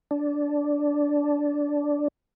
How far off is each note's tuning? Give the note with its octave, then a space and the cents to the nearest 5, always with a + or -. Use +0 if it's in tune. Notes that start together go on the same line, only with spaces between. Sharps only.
D4 -10